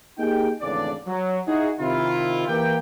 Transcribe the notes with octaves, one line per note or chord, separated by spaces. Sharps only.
A#3 D#4 G4 G#4 G5
G#1 E2 C#3 A3 D4 D5
F#3
D#4 E4 F#4 G#4
C3 D#3 E4 F4
E3 A#3 G4 G5